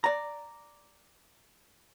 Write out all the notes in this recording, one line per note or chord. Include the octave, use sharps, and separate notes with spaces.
D5 A#5